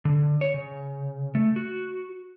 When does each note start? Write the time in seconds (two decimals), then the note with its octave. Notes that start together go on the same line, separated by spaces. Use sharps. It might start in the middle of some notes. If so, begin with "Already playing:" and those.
0.05 D3
0.41 C#5
0.54 C#3
1.35 A3
1.56 F#4